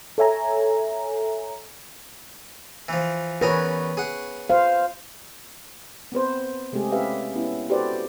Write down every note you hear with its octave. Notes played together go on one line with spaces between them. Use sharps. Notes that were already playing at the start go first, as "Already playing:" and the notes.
A4 C#5 E5 G#5 A#5
E3 F3
E2 A#4 B4 C#5 G#5
G#4 F#5
C5 F5
B3 C4 B4 C5
C3 G#3 A3 C4 G4 G#4
C#4 G4 B4 E5 F5
B3 C#4 E4
F#4 G4 A4 B4 C5 D5